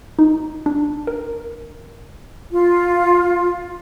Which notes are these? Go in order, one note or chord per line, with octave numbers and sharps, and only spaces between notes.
D#4
D4
A#4
F4